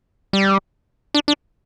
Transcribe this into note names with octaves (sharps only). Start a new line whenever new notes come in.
G3
D4
D4